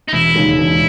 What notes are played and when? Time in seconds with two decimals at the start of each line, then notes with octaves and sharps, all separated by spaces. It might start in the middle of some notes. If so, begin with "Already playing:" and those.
0.08 D#4
0.13 E1 E4
0.35 D#2 C#3 G#3
0.58 E1